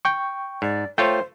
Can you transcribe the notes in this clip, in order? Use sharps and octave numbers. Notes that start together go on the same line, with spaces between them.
G5 C#6
G#2 D5
A3 F4 C5 C#5 G5